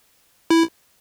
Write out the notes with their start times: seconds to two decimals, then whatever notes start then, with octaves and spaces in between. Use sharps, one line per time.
0.50 E4